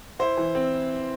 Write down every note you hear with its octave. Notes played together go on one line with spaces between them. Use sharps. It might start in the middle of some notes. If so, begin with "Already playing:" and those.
E4 C5
E3
C4